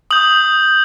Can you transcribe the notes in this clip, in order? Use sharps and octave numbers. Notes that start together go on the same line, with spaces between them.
D#6 G6 F#7